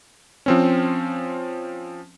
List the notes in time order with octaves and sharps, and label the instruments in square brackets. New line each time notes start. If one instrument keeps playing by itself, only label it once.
[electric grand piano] F3 C4 C#4